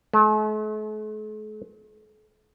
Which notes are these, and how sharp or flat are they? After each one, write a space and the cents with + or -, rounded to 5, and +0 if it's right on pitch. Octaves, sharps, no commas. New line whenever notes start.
A3 -45